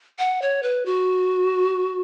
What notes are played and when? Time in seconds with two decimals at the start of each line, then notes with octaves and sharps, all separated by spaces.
0.19 F#5
0.42 C#5
0.63 B4
0.86 F#4